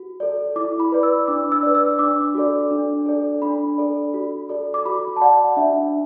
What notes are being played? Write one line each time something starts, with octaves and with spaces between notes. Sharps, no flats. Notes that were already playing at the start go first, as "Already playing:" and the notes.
Already playing: F#4
A4 D5
E4 D6
B5
B4 D5
E6
D4 D6
E6
B4 D5
E6
E6
D4 D6
F#4 A4 D5
D4
A4 D5
D4 B5
A4 D5
F#4
A4 D5
D6
F#4 B5
A5
D5 F#5
D4 E5